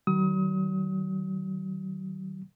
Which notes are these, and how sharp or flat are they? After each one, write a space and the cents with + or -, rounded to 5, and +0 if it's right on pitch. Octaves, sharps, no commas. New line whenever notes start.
D#3 +0 F#3 +40 D#6 +35